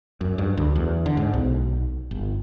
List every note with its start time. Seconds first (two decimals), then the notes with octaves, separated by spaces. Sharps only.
0.21 F#2
0.38 G2
0.57 D2
0.75 E2
1.06 D3
1.17 G#2
1.33 B1
2.11 G1